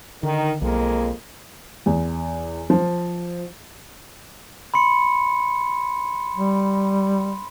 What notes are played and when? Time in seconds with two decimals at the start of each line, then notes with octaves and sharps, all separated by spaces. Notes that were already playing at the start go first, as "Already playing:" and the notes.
0.23 D3 D#3
0.62 B1 F2 G#3 A#3
1.86 E2
2.70 F3
4.74 B5 C6 C#7
6.36 G3